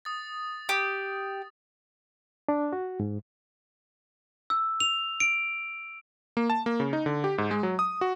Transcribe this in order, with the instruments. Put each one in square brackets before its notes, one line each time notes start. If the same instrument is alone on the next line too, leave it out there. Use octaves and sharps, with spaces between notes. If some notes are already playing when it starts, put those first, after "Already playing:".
[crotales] D#6 A6
[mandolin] G4
[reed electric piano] D4
F#4
G#2
[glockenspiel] E6
F7
D7
[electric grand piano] A#3
A5
A#3
C#3
D#4
D3
G4
G#2
G#3
F#3
D#6
F#4